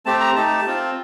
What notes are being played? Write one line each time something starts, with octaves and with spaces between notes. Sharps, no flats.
A3 C4 G4 A5
A#5
A3 D#4 G4 A5
C4 F4